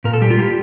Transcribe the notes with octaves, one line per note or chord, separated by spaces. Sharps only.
A#2 A#4
A4
G3 G4
F4
G3 G4